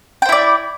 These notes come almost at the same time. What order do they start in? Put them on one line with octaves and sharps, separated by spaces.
G5 C5 E4 D5